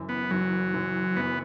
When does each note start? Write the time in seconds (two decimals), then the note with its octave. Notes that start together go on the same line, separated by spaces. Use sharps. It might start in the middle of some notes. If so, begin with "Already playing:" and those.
Already playing: F#1 F#2 E3
0.09 B3
0.30 F#1 F#2 E3 F#3
0.74 F#1 F#2 E3
1.16 F#1 F#2 E3 B3